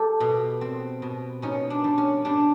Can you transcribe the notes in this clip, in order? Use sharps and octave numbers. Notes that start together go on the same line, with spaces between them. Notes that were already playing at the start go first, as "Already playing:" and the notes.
Already playing: G3 G4 A4
B2
C4
B2
B2 C#4 D#4
D4
G3
C#4
G3 D4